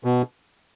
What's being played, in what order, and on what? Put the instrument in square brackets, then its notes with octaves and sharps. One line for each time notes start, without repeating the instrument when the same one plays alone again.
[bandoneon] B2